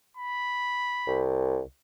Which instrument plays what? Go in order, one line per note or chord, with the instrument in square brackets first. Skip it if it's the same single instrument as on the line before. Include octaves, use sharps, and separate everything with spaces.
[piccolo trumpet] B5
[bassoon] C2